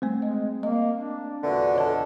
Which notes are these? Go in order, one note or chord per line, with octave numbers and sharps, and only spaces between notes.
G3 A3 C4
G#3 D#5
A#3 D#5
D4
E2 A#2 D3 F#4
A4 C#5 D#5 A5